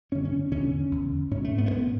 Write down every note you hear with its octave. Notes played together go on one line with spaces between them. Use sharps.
F#2 D3 C#4
C#4
E2 D3 C#4
E2 D3
G#2 C#4
A3
B3
A3
G#2 B3